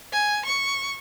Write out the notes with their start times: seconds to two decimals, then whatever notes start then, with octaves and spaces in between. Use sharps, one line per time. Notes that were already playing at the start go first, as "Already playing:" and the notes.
0.13 G#5
0.45 C#6